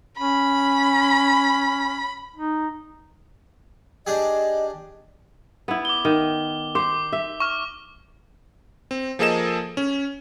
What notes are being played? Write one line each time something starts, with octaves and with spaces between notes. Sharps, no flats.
C#4 B5
D#4
D4 G4 G#4 D#5
B3 E4
D6 G7
D#3
C5 D6
E5
C#6 F6
C4
F3 A#3 G#4 A4 D#5 E7
C#4